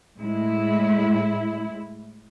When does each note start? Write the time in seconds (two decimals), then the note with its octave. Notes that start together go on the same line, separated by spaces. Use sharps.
0.17 A2 G#3 E4